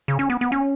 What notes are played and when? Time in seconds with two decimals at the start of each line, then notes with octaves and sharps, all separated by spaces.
0.08 C#3
0.19 C#4
0.30 B3
0.41 B3
0.52 C#4